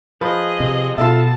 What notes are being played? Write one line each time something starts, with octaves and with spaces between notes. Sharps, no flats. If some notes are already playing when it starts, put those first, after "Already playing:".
F3 G#4 B4 D#5
C3
B2 F4 A4 E5 A5